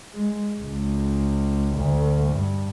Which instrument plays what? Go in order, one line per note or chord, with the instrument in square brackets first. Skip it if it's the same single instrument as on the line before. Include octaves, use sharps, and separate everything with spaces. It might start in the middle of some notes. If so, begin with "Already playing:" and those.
[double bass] G#3
C#2
D2
G2